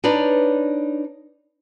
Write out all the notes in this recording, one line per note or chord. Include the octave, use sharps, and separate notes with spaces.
D4 D#4 B4 C#5 D5